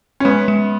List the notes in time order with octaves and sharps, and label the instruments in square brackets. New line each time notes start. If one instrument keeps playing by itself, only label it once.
[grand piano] C#4
[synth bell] G#3 [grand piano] B3
[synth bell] G#3